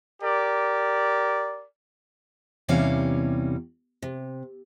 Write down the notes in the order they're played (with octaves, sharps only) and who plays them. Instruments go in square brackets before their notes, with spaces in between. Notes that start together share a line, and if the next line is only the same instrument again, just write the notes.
[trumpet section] G4 A#4 D5
[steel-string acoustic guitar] E2 C3 E3 G3 C#4 F5
C3